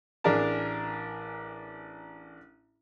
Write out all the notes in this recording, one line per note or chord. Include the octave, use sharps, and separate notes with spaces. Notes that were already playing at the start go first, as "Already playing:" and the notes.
A1 D4 G#4 A#4 A5